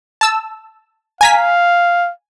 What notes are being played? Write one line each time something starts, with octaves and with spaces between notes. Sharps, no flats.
A5 E6
F5 G#5 A#5 B6